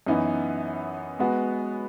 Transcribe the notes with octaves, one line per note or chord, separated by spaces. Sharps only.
F#2 E3 B3 D#4
G#3 B3 F#4